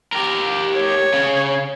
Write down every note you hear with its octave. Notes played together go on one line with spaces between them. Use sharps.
G4 A#4
C#5
C#3